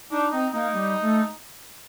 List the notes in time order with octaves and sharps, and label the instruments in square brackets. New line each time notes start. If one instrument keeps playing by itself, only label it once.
[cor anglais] D4 [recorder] D#4
[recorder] C4 [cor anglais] D#4
[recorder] A#3 [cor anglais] D#4
[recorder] G3
A3